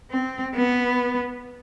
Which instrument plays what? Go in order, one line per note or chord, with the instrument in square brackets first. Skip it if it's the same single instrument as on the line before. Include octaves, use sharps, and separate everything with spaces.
[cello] C4
B3